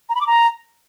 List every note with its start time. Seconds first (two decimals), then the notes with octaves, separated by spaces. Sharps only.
0.09 A#5
0.15 B5
0.21 D6
0.27 A#5